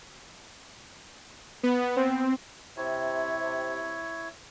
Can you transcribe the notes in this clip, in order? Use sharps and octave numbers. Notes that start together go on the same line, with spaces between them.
B3
C4
C3 E4 C#5